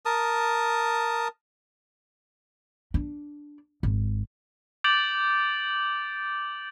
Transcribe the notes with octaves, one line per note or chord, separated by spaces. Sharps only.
A#4 A5 D#6
D4
G#1
D6 G6 A6 D7 F#7